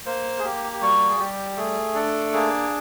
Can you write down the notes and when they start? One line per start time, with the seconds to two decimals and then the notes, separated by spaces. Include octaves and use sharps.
0.06 A#3 C5
0.39 G#4
0.44 A#3 G4
0.72 G4
0.82 G3 F#4
1.09 G#4
1.19 G3 G4
1.57 A3 G#4
1.95 D4 A4
2.33 A#3 G#4